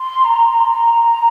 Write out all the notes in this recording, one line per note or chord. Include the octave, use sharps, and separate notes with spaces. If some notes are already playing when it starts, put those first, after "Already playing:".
Already playing: C6
A#5
C6
A#5